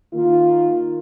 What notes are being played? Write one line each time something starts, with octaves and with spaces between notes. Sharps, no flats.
D#3 A#3 F4